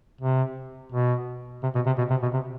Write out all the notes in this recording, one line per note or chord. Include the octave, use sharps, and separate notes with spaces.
C3
B2
C3
B2
C3
B2
C3
B2
C3